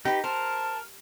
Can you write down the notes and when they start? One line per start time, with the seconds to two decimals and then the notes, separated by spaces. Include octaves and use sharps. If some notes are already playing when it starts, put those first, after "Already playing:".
0.05 D#4 G4 B4
0.24 A#4 C5 A5